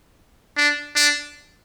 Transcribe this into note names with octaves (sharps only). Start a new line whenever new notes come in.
D4
D4